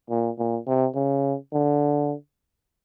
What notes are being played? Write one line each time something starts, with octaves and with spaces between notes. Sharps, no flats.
A#2
A#2
C3
C#3
D3